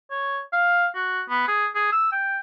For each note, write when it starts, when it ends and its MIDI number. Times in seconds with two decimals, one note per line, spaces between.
0.11 0.40 73
0.53 0.87 77
0.95 1.21 66
1.29 1.43 59
1.48 1.67 68
1.75 1.91 68
1.92 2.11 88
2.12 2.39 79